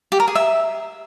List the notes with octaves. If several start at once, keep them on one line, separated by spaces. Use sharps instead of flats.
G4
A#4
G#4
E5